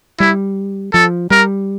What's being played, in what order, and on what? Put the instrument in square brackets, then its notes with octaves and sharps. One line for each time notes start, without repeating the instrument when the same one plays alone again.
[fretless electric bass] G3 [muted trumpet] E4
[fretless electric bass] F3 [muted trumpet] A4
[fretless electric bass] G3 [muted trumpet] A#4